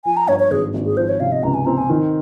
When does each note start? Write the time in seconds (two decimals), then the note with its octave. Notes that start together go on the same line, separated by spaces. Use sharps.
0.05 F3 G#5
0.17 A#5
0.28 G2 C#5
0.39 C#5
0.51 G#1 G#4
0.74 G#1
0.85 G#4
0.97 F3 C5
1.09 C#5
1.20 C3 F5
1.32 D#5
1.43 C#2 A#5
1.54 G#5
1.66 C4 A#5
1.78 G#5
1.89 D#3